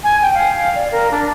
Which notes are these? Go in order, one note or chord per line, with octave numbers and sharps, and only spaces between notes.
G#5
G5
F5
D5
A#4
D4